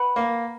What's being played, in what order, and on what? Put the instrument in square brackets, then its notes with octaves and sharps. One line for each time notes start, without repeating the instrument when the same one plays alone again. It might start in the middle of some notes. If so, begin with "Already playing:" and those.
Already playing: [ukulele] B4 F#5 B5
[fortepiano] A#3